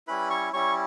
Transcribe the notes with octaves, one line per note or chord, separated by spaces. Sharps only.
G3 C#4 E4 B4 B5
C#5 C#6
G3 C#4 E4 C#5 C#6